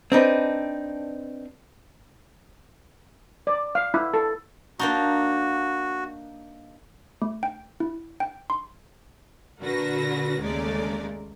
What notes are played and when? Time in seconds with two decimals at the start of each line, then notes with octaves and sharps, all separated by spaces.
0.12 C4 D4 D#4 B4
3.47 D5
3.75 F5
3.94 E4
4.14 A4
4.79 A#3 D4 D#4 F#4
7.22 A3
7.43 G5
7.80 E4
8.20 G5
8.50 C6
9.61 A#2 D3 F#4 A#4 B4 A#6
10.40 D#2 C#3 G#3 A3 A#4 D5